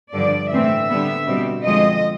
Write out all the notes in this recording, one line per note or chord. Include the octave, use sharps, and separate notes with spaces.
G2 D3 F3 D5
A2 E3 A3 C4 E5
D3 G3 B3
B2 G3 C4
F2 D3 F3 G#3 C4 D#5